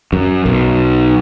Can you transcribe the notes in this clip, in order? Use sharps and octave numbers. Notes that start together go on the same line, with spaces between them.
F#2
B1